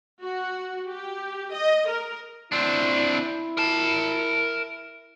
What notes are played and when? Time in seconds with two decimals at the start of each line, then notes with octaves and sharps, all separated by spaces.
0.22 F#4
0.89 G4
1.53 D#5
1.88 A#4
2.52 C4 D4 E4
3.57 A#4 A5